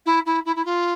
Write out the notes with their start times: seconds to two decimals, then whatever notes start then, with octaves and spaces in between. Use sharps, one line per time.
0.06 E4
0.26 E4
0.45 E4
0.56 E4
0.65 F4